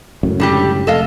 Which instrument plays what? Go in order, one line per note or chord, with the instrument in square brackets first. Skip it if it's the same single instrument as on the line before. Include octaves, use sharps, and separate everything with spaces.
[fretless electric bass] C#2 F#2 A2
[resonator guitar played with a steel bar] D3 G3 G4
[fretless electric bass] F1 [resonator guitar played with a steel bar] A4 D#5 F5